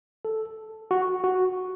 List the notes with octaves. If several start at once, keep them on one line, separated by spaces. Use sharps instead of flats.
A4
F#4
F#4